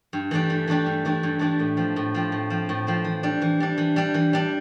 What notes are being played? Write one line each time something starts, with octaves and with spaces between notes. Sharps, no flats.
G2
E3 A3 D4 G4
G2
E3 A3 D4 G4
G2
E3 A3 D4 G4
G2
E3 A3 D4 G4
A2
F3 C4
A2
F3 C4
A2
F3 C4
A2
F3 C4
E3
G3 D4
E3
G3 D4
E3
G3 D4
E3
G3 D4